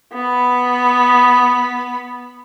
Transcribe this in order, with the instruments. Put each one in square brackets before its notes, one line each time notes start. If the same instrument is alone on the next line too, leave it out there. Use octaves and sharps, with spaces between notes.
[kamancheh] B3 B5